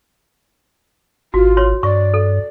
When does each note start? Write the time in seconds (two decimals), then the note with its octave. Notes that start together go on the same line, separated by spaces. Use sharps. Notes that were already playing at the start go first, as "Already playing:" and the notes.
1.34 G#1 F4 F#4
1.57 C#5 C6
1.83 G2 D5 C#6
2.14 A4